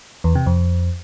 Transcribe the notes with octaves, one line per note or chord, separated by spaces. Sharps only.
E2
C3
F2